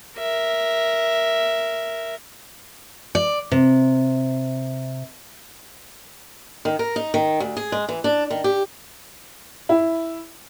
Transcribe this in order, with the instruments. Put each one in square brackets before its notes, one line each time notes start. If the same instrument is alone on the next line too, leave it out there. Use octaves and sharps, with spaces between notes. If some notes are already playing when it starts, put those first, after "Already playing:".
[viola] A#4 E5
[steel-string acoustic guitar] D5
C3
D#3
A#4
D#4
D#3
D2
G#4
G#3
E3
D4
D#3
G4
[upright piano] E4